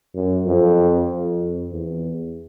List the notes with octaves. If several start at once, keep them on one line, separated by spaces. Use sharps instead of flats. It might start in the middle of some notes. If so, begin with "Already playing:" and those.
F#2
F2
F2
E2